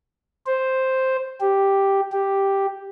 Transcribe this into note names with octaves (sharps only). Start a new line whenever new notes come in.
C5
G4
G4